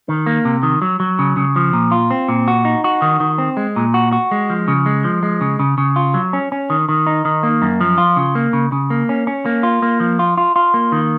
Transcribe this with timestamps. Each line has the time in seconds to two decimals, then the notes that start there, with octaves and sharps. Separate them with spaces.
0.09 D#3
0.26 A#3
0.45 C3
0.63 D#3
0.82 F#3
1.00 F#3
1.19 C#3
1.37 C#3
1.56 F3
1.73 A#2
1.92 F4
2.11 C4
2.29 A#2
2.48 F#4
2.65 D#4
2.84 F#4
3.02 D#3
3.20 D#3
3.38 C4
3.57 G#3
3.76 A#2
3.94 F#4
4.13 F#4
4.31 G#3
4.50 F3
4.68 C#3
4.86 G#3
5.04 F3
5.23 G#3
5.41 C#3
5.59 C#3
5.78 C#3
5.96 F4
6.14 F#3
6.33 C#4
6.52 C#4
6.70 D#3
6.89 D#3
7.07 D#4
7.25 D#3
7.43 A#3
7.62 F#2
7.81 F3
7.98 F4
8.16 C#3
8.35 A#3
8.53 C#3
8.72 C#3
8.90 A#3
9.09 C#4
9.27 C#4
9.46 A#3
9.63 F4
9.82 A#3
10.00 F3
10.19 F4
10.37 F4
10.56 F4
10.74 A#3
10.92 D#3